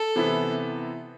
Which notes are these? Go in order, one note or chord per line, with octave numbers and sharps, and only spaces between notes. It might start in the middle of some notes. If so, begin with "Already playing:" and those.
Already playing: A4
C3 E3 B3 E4